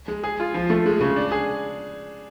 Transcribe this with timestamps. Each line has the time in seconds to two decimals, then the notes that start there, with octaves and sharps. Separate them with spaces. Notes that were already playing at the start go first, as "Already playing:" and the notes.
0.08 G#3
0.24 G#4
0.40 F4
0.54 F3
0.70 A3
0.86 G#3
1.01 C#3
1.16 D4
1.32 G#4